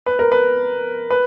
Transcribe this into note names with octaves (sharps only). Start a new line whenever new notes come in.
B4
A#4
B4
B4